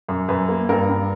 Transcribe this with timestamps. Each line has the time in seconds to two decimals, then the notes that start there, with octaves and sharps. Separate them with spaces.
0.08 F#2
0.28 F#2 B4
0.49 A#3
0.69 G2 A#4
0.89 G2